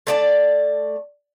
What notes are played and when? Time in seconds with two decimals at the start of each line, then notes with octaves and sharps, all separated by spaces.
0.07 A3 D5 A5